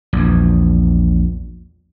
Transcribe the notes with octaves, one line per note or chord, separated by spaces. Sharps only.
A#1 E2